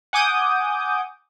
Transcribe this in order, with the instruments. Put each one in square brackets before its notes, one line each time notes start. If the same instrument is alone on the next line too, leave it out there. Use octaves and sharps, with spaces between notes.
[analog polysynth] F#5 G#5 D6 D#6 G6